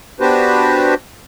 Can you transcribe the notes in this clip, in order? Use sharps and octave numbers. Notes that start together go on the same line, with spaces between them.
B3 D4 F#4 G4 B4 C5